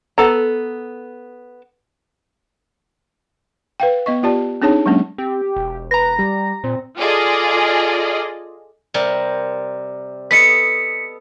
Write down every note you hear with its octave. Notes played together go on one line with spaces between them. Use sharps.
B3 A4 A#5
B4 F5 G5
B3 D#5 C#6
B3 F4 G4 D5 A5
C4 D4 D#4 G#4 C#5 A5
F#3 G#3 A#3 C#4 D4
C4 G4
E1
B4 A#5 A#6
G3
A#2 C4
F4 G#4 A4 D5 D#5
C3 G3 A#4
B3 A4 D#5 B6 C#7